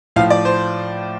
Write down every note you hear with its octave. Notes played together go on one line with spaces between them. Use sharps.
A2 F3 F5
D5
C5